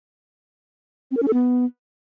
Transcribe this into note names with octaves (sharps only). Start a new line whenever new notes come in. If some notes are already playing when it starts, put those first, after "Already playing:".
C4
A#4
C#4
A4
B3